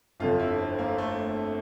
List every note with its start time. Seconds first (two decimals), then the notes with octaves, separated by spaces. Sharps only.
0.20 G1 F2 D3 F4
0.40 E4
0.58 C4
0.79 A#3
0.98 A3